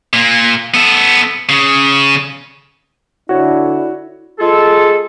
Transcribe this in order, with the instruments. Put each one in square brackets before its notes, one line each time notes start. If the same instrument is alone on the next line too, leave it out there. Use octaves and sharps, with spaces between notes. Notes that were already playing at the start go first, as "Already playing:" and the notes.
[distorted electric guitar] A#2 A#3
B3 A4
C#3
[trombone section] D3 D4 [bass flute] E4 [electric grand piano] F#4 C#5
[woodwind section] G#3 F4 G#4 A4